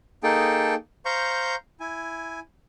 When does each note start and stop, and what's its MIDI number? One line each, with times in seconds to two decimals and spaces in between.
0.23 0.74 58
0.23 0.74 63
0.23 0.74 68
0.23 0.74 69
0.23 0.74 79
0.23 0.74 81
1.05 1.55 72
1.05 1.55 77
1.05 1.55 82
1.05 1.55 85
1.05 1.55 91
1.80 2.40 64
1.80 2.40 80